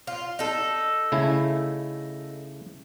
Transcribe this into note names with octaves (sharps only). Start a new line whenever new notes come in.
F4
D#4 A4
C#3 A3 E4